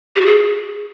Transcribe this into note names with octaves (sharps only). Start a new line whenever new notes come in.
G4
F#4
G#4